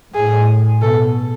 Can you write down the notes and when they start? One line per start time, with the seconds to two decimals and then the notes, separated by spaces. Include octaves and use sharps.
0.15 A2 G#4
0.81 B2 A4